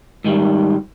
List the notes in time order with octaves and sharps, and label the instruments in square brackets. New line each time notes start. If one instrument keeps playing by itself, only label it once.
[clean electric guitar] G#2 D#3 G3